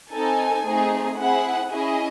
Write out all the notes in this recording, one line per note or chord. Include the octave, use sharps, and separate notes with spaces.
C4 D#4 A4 G#5
A3 C4 D#4 G#4
C4 E4 G#4 F#5
C#4 E4 G#4 D#5